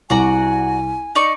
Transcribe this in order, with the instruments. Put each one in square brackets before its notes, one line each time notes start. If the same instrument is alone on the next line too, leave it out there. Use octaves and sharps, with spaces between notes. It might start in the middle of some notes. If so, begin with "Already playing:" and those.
[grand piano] C2 [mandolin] F#4 D5 A#5 [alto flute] G#5
[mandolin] D#4 D5 C#6